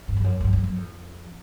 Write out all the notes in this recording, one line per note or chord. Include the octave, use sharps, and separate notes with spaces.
G2
F2
F#2
F#2
F#2
F#2
F2